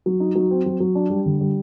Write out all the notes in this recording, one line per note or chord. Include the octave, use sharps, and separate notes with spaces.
F#3
D#4
F#3
C4
F#3
F#3
D4
G3
D3
G3